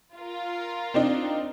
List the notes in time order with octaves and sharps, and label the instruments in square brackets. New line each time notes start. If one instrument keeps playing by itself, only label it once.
[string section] F4 A#4
[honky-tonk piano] C4 D4 D#4